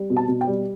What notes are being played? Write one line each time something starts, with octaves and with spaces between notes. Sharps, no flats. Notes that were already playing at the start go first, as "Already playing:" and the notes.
Already playing: G3
B2
A5
B2
G5
G3